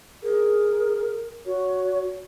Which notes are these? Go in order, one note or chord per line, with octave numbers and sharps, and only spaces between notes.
G#4 A#4
F#4 C#5